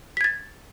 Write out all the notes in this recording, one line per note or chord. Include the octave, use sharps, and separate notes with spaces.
G#6 A6 B6